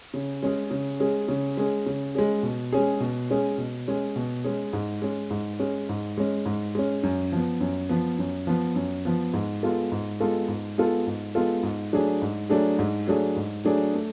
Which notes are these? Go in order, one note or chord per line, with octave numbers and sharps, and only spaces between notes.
C#3
G#3 C#4 G#4
C#3
G#3 C#4 G#4
C#3
G#3 C#4 G#4
C#3
G#3 C#4 G#4
B2
G#3 C#4 G#4
B2
G#3 C#4 G#4
B2
G#3 C#4 G#4
B2
G#3 C#4 G#4
G#2
G#3 C#4
G#2
G#3 C#4
G#2
G#3 C#4
G#2
G#3 C#4
F#2
F3 B3
F#2
F3 B3
F#2
F3 B3
F#2
F3 B3
G#2
G#3 B3 F4 A4
G#2
G#3 B3 F4 A4
G#2
G#3 B3 F4 A4
G#2
G#3 B3 F4 A4
G#2
F#3 A3 D4 G#4
G#2
F#3 A3 D4 G#4
G#2
F#3 A3 D4 G#4
G#2
F#3 A3 D4 G#4
A3